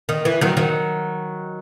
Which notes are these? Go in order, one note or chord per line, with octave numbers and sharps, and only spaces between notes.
D#3
E3
D#3 F#3
D#3 F#3